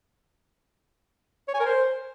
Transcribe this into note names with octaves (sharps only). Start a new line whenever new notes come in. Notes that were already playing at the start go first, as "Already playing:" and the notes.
C#5
G#5
A#4
C5